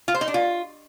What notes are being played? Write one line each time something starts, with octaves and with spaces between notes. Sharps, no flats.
F4
C5
D#4
D4
F4